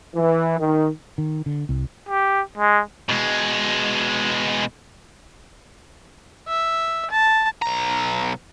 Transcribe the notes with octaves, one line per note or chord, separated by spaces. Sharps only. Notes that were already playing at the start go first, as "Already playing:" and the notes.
E3
D#3
D#3
D3
C2
G4
G#3
B2 G#3
E5
A5
B1 A#5